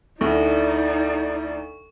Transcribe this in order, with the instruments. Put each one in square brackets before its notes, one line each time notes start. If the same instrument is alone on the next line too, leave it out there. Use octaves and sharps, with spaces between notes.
[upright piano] D2 [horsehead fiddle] D#4 D5 [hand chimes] E4 A4 E5 [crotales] C#6